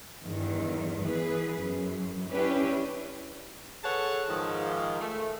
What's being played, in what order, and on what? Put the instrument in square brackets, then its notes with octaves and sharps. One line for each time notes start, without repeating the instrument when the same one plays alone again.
[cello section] E2 G2 D#3
E3 B3 G#4 B4
F#2
C#4 D4 E4 G4 B4
[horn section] G#4 A4 B4 C#5 F#5 A5
G#2 D#3 F3
A3